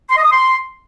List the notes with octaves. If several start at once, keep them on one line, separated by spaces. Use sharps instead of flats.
C6
D#5
D#6
C6